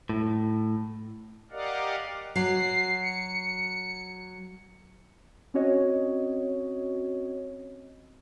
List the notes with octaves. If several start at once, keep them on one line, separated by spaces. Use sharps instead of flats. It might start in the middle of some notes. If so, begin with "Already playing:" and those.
A2
G4 A#4 D5 D#5 F5 F#5
F#3 C7
C#7
C4 C#4 F#4 C#5 D#5